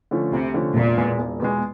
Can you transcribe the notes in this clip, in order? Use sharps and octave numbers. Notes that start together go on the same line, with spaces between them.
D3 F3 A3 C#4
D2 C3
D3 F3 A3 C#4
E1 A#2
E2 B2 G#3
E1
E2 B2 G#3